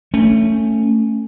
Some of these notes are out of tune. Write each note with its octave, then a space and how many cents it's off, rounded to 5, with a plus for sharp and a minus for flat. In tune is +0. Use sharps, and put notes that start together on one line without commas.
A3 +15 C#4 +0